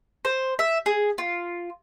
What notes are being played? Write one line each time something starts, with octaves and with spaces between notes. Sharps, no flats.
C5
E5
G#4
F4